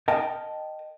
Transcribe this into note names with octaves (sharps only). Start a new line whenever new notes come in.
A#4 D#5 G5 A5